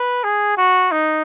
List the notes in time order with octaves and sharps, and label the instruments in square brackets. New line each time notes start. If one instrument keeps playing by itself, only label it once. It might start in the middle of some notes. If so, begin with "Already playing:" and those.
Already playing: [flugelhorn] B4
G#4
F#4
D#4